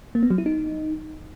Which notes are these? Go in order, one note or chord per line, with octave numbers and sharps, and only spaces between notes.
A#3
B3
F#3
E4
D#4